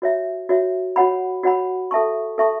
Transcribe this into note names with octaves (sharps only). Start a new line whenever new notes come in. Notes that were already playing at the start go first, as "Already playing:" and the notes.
F#4 C#5 E5
F#4 C#5 E5
F#4 C#5 F#5 B5
F#4 C#5 F#5 B5
A4 E5 A5 C#6
A4 E5 A5 C#6